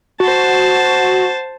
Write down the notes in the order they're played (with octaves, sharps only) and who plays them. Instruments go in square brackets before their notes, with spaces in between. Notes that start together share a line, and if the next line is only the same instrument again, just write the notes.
[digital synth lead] F#4 [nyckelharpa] C5 A5